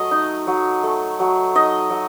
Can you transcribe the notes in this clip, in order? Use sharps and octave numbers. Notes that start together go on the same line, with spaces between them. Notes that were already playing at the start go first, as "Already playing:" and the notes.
Already playing: F#3 A3 D#5
D#4
F#3
A3
F#3
D#4 D#5
F#3